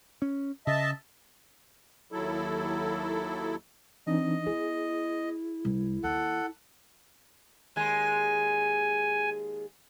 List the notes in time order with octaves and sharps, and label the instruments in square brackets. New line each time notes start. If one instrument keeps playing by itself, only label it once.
[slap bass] C#4
[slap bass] C#3 [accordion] D#5 E5 A5
[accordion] D#2 F#3 E4 A4
[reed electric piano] E3 D4 D#4 [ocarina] C4 [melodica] D#5
[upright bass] B3 [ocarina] E4 [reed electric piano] G#4
[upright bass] C2
[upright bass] D#2 [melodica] A4 F#5
[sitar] D#2 G#3 [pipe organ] G#5